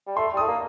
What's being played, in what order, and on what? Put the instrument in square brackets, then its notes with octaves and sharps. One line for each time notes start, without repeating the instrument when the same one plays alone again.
[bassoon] G3
[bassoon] A3 [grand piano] C6
[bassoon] G3
[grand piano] D#6
[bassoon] A3
A#3